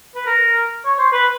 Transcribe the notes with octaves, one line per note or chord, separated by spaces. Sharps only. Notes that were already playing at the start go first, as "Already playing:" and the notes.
B4
A#4
C#5
C5
B4